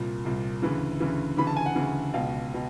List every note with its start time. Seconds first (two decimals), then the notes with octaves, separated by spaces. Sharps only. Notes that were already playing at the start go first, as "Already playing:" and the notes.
Already playing: C2 A#2
0.25 C2 A#2
0.62 D2 C#3 E3
1.00 D2 C#3 E3
1.37 D2 C#3 E3 B5
1.47 A5
1.57 G#5
1.66 F#5
1.75 D2 C#3 E3
2.14 C#2 B2 F5
2.54 B2